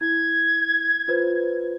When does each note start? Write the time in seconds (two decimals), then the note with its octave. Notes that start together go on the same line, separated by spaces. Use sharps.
0.01 E4 G#6
1.08 F4 B4 C5